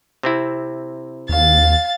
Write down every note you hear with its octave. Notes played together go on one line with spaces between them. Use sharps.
C3 C4 E4
D#2 F5 A6